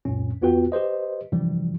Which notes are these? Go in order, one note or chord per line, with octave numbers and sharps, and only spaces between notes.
C#2 F#2 A#2 C#4
E2 B3 F4 F#4 B4 G5
G4 B4 C5 D#5
G2 C3 E3 F3 G3